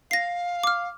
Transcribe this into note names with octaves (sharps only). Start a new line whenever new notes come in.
F5 A#6 C7
D6 F6